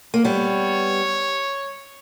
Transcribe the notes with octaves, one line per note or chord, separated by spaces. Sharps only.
A#3
G3 B3 C#5